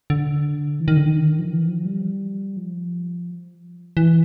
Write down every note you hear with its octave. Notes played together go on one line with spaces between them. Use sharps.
D3
E3
D#3
D3
D#3
F3
E3
F3
G3
F3
E3